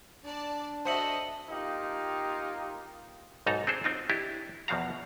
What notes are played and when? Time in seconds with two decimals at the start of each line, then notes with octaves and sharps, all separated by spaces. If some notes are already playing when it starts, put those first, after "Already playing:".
0.24 D4 D5 A5
0.85 F#4 A4 C5 D#5 E5 A5 C#7 F#7
1.49 A#3 D#4 F4 G4
3.46 B1 G#2 D#4 A4 A#5
3.67 C4 D4 G#4 A4 C5
3.84 C4 D#4 F4
4.10 D4 E4 G4 D#5
4.68 E2 B2 F3 F#4 F5 A#5